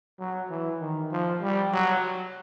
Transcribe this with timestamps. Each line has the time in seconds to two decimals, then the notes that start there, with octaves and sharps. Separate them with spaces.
0.20 F#3
0.50 E3
0.81 D#3
1.12 F3
1.43 G3
1.73 F#3